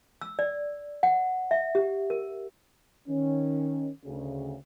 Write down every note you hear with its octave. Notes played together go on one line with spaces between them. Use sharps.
E6
D5
F#5
E5
G4
A#4
D#3 C#4
D2 C#3